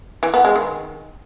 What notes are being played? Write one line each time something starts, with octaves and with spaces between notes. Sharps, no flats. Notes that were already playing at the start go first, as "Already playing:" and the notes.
E3
B3
G#3
D#3